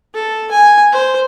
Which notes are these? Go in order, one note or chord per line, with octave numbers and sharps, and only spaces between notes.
A4
G#5
C5